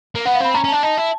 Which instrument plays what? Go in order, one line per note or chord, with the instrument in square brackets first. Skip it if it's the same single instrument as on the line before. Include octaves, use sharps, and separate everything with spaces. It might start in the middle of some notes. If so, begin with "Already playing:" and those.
[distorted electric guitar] A#3
[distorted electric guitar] B3 [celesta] F#5
[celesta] F5
[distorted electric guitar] C4 [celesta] B5
[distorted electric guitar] C#4 [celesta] A#5
[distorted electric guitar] C#4
[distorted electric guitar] D4 [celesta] A5
[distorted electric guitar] D#4 [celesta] A5
[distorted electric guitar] E4